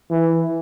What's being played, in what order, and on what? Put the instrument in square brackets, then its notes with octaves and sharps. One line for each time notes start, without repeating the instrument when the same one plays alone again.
[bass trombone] E3